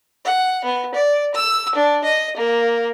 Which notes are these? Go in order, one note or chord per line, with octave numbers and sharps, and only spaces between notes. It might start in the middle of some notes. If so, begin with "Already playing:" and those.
F#5
B3
D5
E6
D4
D#5
A#3